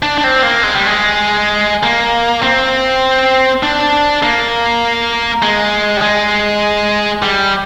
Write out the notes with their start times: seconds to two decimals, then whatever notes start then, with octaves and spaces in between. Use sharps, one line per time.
0.03 D4
0.18 D4
0.24 C4
0.43 A#3
0.63 G#3
0.75 G3
0.86 G#3
1.83 A#3
2.43 C4
3.63 D4
4.23 A#3
5.43 G#3
5.97 G3
6.02 G#3
7.22 G3